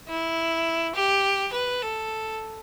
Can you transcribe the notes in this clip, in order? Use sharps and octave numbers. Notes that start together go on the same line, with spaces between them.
E4
G4
B4
A4